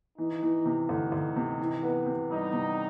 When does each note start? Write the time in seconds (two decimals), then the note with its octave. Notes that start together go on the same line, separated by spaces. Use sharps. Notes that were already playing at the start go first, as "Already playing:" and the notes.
0.18 E3 D#4
0.42 E3
0.65 C3
0.89 D2 D#4
1.12 D2
1.36 C3
1.60 E3
1.83 B3
2.06 C3
2.30 G3 D#4
2.53 C3